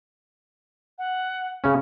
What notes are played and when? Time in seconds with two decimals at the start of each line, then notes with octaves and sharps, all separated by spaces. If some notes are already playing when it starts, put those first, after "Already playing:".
0.98 F#5
1.64 C#3 C#4